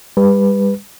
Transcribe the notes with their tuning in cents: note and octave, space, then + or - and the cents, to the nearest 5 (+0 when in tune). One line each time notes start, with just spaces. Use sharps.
G3 +30 B4 +0